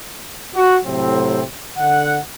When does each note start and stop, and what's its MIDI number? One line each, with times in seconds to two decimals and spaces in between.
0.56 0.78 66
0.86 1.42 45
0.86 1.42 48
0.86 1.42 54
0.86 1.42 60
1.78 2.18 50
1.78 2.18 78